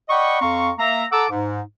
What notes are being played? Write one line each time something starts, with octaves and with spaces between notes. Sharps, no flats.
D5 D#5 F#5 G5 B5 C#6
F2 C4 F5 A#5 C#6
A#3 E5 A#5
A4 F#5 A5 A#5 D6 E6
G#2